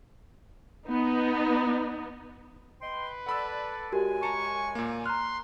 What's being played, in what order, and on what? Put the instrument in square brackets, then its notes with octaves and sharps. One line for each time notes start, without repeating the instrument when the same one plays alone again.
[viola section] B3 D#4
[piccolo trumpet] B4 [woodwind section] D#5 G5 C6
[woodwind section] A4 D5 [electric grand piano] F#5 B5 E6
[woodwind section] F#2 G#3 G#5 [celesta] F#4 G4 A#4
[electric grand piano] A5 A#5 [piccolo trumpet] C#6 [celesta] C#7
[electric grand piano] A#2 A#3
[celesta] A#5 F#6 [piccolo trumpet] C6 [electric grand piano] F6